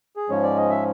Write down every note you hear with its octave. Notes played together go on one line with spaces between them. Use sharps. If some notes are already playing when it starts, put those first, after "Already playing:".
G#4
G#2 F3 G#3 C#4 C#5
D5
D#5
E5